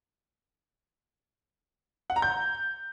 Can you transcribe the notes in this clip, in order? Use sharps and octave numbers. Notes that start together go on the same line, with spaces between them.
F#5
A#5
G6